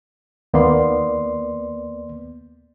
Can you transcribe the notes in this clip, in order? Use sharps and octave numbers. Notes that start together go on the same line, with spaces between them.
D#2 A#3 B3 D5 C6